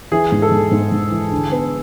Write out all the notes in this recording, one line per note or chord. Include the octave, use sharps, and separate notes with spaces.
E3 G#4
G#2
A4
G#2
G#2
G#2
E3
D3
B3